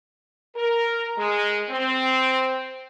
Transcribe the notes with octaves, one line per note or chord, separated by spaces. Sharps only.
A#4
G#3
C4